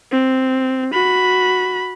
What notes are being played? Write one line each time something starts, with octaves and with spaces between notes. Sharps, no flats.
C4
F#4 B5